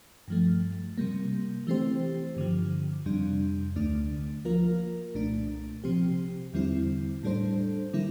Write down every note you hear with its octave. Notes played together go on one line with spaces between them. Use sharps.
G2 F3 A3
C3 G3 A#3
E3 A3 C4 G4 C5
G2 D3 F3
F2 C3 G3 D4
D2 D3 A3 D4
F3 A#3 F4 A#4
C2 A#2 A3 D4
C3 F3 C4 G4
E2 D3 G3 C4 E4
A2 G3 D4 A4 C5
D3 G3 A#3 E4